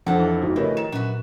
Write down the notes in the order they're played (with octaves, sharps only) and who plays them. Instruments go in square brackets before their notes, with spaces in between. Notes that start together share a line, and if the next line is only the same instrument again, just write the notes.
[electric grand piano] F2 C4 D4 [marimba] F3 [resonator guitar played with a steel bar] A4 F#5
[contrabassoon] E3
[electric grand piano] G1 [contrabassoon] G#2 [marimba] F#4
[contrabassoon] A2 [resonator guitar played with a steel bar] C#3 [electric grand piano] E4 B4 C#5 [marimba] G4 A#4 D#5
[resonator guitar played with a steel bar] D#3 [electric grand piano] E7
[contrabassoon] F#2 [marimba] A#2 [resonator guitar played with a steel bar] F#4 B4